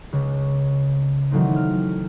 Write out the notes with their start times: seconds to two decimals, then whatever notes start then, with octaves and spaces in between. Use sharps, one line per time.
0.13 C#2 C#3
1.31 D#3 E3 F#3 A3 C4 D#4
1.56 F6